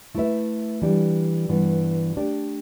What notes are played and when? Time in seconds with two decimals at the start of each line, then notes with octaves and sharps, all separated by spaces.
0.15 A3 E4 B4 E5
0.82 E3 G3 D4
1.49 G2 E3 B3
2.16 A3 D4 G4 D5